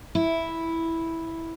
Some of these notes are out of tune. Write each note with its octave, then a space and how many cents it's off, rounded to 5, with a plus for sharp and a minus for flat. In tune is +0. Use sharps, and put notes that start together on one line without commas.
E4 -5